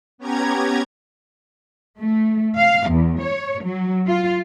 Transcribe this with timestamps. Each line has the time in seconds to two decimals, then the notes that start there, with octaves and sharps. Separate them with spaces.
0.18 B3 C#4 G4 A#5 G#6
1.99 A3
2.58 F5
2.89 E2
3.22 C#5
3.64 F#3
4.07 F4